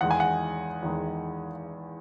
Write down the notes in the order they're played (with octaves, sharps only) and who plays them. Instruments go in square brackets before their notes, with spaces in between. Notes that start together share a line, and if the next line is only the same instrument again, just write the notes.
[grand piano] E2 D#3 G#3 F#5
G#5
F#5
E2 D#3 G#3